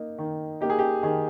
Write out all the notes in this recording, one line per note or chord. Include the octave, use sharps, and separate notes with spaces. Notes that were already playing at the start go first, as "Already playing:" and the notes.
Already playing: A#3 D#4
D#3
A#3 D#4 G4
G#4
G4
D#3 G#4